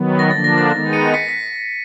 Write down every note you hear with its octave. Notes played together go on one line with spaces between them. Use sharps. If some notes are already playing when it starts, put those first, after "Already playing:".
Already playing: D#3 F#3 B3
A#6
D3 F3 A#3 D4 A6
A#6
A#6
D#3 G#3 B3 D#4
C#7 D#7
B6 C#7
B6